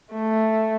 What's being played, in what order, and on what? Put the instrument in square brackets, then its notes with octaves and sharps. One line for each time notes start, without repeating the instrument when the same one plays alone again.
[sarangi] A3